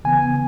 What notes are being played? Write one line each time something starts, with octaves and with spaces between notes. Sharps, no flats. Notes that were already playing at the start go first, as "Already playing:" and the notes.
C#3 E3 B3 G#5